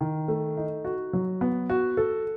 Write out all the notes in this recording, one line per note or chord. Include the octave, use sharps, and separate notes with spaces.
D#3
A3
D#4
F#4
F#3
B3
F#4
A4